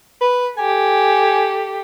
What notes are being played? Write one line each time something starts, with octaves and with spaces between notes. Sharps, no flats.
B4
G4 A4 G#5